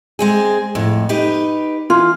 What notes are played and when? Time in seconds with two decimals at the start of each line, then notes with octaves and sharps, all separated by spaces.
0.19 G#3 C4 G#4
0.75 F2 A2
1.09 D#4 G4 B4
1.90 E3 F4